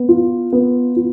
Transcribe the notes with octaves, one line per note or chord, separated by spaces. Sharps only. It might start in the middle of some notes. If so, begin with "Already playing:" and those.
Already playing: B3
F4
B3
F4